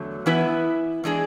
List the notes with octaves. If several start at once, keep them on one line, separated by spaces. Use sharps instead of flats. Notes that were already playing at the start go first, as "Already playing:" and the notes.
Already playing: E2 D3 F#3 A3
E3 B3 E4 B4 E5
E3 G#3 D4 G#4